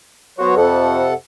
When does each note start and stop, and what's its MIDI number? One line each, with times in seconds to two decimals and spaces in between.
0.39 0.55 54
0.39 0.53 59
0.39 0.53 66
0.39 0.55 72
0.39 0.55 73
0.56 1.07 41
0.56 1.14 48
0.56 1.14 69
0.56 1.14 78